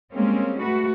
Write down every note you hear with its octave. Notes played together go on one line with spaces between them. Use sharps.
G3 G#3 A#3 C4 C#4
A3 F#4 B4